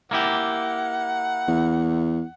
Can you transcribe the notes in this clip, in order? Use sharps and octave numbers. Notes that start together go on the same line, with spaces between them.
A#3 E4 G4 F#5
E2